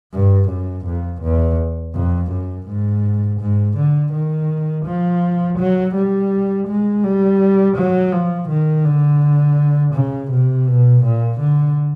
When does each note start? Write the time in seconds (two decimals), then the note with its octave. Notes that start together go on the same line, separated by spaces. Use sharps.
0.13 G2
0.49 F#2
0.86 F2
1.22 E2
1.94 F2
2.31 F#2
2.67 G#2
3.40 G#2
3.77 D3
4.13 D#3
4.85 F3
5.58 F#3
5.95 G3
6.68 G#3
7.03 G3
7.77 F#3
8.12 F3
8.49 D#3
8.85 D3
9.94 C#3
10.31 C3
10.67 B2
11.04 A#2
11.40 D3